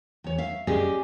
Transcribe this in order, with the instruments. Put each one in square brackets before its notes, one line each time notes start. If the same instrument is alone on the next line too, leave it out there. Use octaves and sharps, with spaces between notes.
[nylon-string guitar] E2 C#5
E5 F5
C#4 G4 G#4 D5 D#5